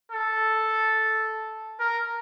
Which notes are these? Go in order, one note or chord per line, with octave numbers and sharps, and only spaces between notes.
A4
A#4